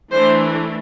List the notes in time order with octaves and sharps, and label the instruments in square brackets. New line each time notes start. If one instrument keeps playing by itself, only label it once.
[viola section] E3 A3 D4 C5